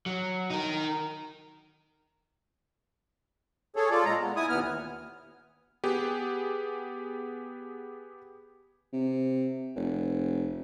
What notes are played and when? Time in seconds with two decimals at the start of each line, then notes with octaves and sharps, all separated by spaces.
0.06 F#3
0.50 D#4 A#4
3.76 G#4 A4 C#5
3.90 F4 A4 D5
4.05 A#2 G#3 A#5
4.21 B3
4.36 E4 G#5 D#6
4.49 D#2 A#2 B3 F6
5.84 B3 G4 G#4
8.92 C3
9.76 F1